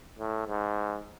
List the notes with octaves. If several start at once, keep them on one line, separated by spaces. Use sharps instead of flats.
A2
G#2